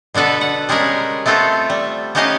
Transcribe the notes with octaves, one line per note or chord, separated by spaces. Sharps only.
B2 D3 B3 A4 B4
F#5
G3 G#3 C#4 G#4 A#4 B4
A3 B3 C4 F4 A4
G3
B3 C#4 D#4 G4 D#5 F5